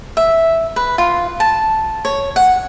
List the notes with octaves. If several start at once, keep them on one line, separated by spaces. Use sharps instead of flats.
E5
B4
F4
A5
C#5
F#5